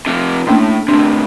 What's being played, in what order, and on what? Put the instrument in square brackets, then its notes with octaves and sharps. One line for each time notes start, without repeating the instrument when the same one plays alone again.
[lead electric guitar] C3 F3
[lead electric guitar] A2 [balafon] A#3 C#4 D4
[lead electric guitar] A2 C3 [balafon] D4